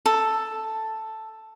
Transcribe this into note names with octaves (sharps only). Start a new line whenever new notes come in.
A4